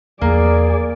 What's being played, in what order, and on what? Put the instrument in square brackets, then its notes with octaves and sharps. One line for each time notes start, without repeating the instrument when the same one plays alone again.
[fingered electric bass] E2 F3 [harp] A#3 [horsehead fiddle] G#4 D5